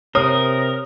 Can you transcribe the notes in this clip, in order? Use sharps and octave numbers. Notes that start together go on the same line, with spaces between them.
C3 A#4 C#5 D#6